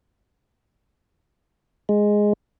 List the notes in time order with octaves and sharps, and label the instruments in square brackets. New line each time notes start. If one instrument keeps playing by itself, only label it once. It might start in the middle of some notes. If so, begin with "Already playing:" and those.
[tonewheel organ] G#3